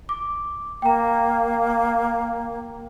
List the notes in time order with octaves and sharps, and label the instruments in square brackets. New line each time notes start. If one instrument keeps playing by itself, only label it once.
[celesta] D6
[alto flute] A#3 [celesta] G5 A#5